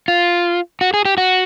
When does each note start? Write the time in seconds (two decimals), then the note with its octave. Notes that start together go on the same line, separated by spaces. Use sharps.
0.08 F4
0.81 F#4
0.94 G#4
1.05 G4
1.18 F#4